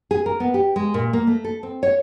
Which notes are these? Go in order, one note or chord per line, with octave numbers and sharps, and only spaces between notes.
G#4
A#4
B3
G4
G#3
A#2
A#3
A3
A4
C4
C#5